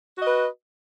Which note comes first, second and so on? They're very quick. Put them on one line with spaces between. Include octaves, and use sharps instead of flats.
F#4 D#5 B4